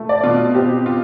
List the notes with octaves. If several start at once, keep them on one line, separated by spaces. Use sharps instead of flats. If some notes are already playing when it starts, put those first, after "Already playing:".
Already playing: A3
D5
B2 F4
C4 G4
F4